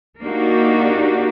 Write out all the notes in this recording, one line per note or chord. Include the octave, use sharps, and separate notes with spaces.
A#3 D4 D#4 F#4 G4